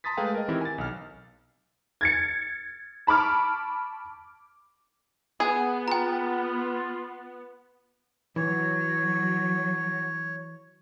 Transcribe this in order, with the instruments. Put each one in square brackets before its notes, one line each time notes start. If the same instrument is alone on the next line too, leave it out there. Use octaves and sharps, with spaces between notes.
[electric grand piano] A5 A#5 C6 D#6 A6 B6
G#3 A3 G#4 B4 F5 G5
A#4 D#5
D#3 E3 C4 E4 G4 A#4
G#5 A6
B1 F6
[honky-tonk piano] G#6 A6 C#7
A5 B5 C#6 D6 F6
[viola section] B3 [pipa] G#4
[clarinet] F4 [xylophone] G5 A#5
[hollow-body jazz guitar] E3 [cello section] F#3 [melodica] C#5